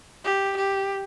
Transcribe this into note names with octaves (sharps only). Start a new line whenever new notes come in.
G4
G4